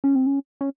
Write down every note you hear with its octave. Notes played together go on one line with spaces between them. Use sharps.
C#4
C4
C#4
C#4